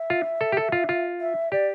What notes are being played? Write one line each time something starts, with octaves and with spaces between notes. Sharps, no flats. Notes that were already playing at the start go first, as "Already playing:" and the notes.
Already playing: E5
F4
A4
G4
A4
F4
F4
E5
G4 D5